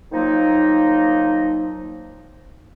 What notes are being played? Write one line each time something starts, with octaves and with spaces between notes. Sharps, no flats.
D#3 F3 F#3 A#3 D#4